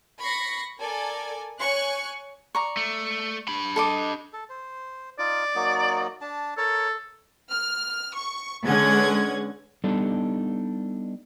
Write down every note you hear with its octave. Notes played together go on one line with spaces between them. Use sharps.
B5 C#6 A#6 C7
A4 A#4 D5 G#5
C#5 G#5 C#6 F#6
D5 A#5 C#6
A3
D4 B5
A4 D#5 D6
A4
C5
D#4 F4 D5
F#3 A#3 D#4
D4 A5
A4 A#4 C#5
F6
C#6
D3 G#3 C#4 B4 F#5 G#6
G3 B3 D4 D#4 A4